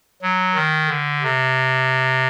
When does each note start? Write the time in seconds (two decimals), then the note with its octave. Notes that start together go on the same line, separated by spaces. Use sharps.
0.22 F#3
0.55 D#3
0.88 D3
1.22 C3